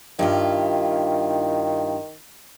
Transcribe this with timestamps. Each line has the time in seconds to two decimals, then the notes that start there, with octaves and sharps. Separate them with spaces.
0.19 G2 D#3 E4 F4